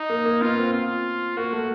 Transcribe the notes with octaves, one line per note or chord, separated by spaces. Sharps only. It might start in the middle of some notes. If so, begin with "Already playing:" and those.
Already playing: D#4
A#3
A#3
B3 F4
C4
F4
A#3 F#4
A3